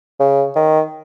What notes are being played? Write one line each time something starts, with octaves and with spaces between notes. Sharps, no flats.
C#3
D#3